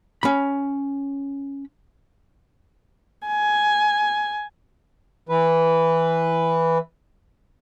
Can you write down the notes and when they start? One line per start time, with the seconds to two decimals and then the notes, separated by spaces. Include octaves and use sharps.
0.23 C#4 B5
3.27 G#5
5.29 E3 B4